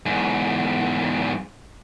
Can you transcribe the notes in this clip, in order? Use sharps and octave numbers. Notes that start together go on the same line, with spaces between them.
E2 G#2